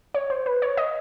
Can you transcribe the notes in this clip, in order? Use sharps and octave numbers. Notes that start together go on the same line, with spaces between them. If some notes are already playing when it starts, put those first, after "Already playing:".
C#5
C5
B4
C#5
D#5